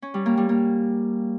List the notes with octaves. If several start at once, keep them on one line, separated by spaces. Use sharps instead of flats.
C#4
G3
A#3
G3
A#3